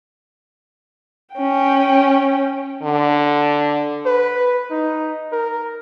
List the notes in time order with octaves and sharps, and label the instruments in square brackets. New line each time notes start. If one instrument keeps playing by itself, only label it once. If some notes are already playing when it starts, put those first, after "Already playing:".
[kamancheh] C#4 G5
[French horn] D3
[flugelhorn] B4
D#4
A#4